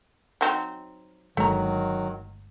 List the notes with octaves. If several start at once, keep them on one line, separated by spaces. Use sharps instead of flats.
F#3 C4 D#4
G1 D#3 F#3 G#3 A3 D4 A#5